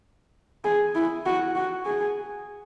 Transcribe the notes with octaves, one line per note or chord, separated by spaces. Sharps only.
G#4
E4
F#4
F#4
G#4